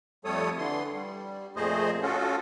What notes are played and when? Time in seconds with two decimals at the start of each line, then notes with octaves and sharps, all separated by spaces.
0.25 F2 G3 A3 A4 C#5 D#6
0.58 D3 E3 C6
0.93 G3
1.56 F2 A#2 A3 G#4 C5 D#5
2.02 C#4 F4 F#4 A4